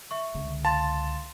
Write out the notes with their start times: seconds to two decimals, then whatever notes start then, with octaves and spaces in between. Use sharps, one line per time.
0.11 E5 C#6
0.35 C#2 D3
0.65 F5 A5 C6 A6